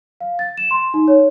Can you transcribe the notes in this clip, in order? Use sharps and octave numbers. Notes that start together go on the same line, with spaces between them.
F5
A6
E7
C6
D#4
C#5